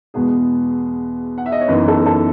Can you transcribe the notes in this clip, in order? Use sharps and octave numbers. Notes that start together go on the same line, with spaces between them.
E2 B2 G#3 B3 G#4
F#5
E5
D#5
C#5
F#2 E3 B3 D#4 B4
A4
A4